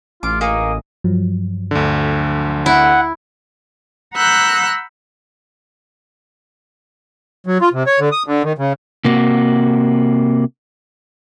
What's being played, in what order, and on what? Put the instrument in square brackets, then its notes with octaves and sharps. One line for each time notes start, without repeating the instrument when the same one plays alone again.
[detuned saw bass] A1 [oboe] F4 [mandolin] D6
[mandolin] A#3 D#4 G#4 [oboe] D#5
[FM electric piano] G2 F3 F#3
[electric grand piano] D2 D3
[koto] E4 [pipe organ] F#5
[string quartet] F#5 A#5 B5 E6 F#6 G6
[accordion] F#3
F4
C3
C#5
D3
D#6
D3
D#3
C#3
[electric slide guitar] C3 A#3 F#4